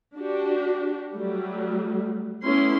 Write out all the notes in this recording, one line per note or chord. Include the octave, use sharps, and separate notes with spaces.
D4 F#4 G4
F#3 G3 A3
A3 B3 C#4 E4 C6